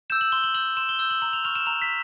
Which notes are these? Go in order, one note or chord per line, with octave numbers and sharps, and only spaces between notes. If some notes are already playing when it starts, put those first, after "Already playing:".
E6 G6 E7
F#7
C6 G7
F#7
E6 G6 F#7
C6 E7
G7
E6 G6
F#7
A#5 F#7
F7
C#6 F6 F7
E7
A#5 F7
B6